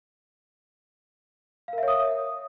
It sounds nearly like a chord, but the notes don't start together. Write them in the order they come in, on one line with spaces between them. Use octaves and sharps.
F5 A#4 E5 C#5 D#6